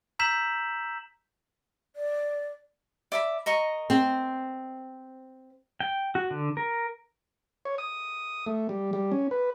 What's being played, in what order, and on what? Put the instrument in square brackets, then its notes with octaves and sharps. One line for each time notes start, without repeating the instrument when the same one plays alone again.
[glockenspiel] A#5 E6 G6 B6 E7 F#7
[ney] D5
[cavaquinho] D5 E5 B5
A#4 D#5 C#6
[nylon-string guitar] C4
[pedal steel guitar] G5
F#4
D3
A#4
[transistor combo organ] C#5
D#6
A3
G3
G3
C#4
B4